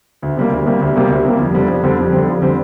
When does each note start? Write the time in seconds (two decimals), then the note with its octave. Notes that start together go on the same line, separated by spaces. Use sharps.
0.22 D2
0.37 C3 G3 A#3
0.51 D2
0.66 C3 G3 A#3
0.81 D2
0.96 C3 G3 A#3
1.10 D2
1.25 C3 G3 A#3
1.39 F2
1.54 D3 G3 C4
1.68 F2
1.84 D3 G3 C4
1.98 F2
2.13 D3 G3 C4
2.27 F2
2.42 D3 G3 C4